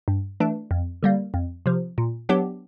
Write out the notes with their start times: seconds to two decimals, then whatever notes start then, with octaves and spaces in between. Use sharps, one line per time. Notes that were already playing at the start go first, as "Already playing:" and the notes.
0.08 G2
0.40 E3 A3 D4
0.71 F2
1.03 D3 G3 A#3
1.34 F2
1.66 C3 F3
1.98 A#2
2.29 F#3 B3 D4 G4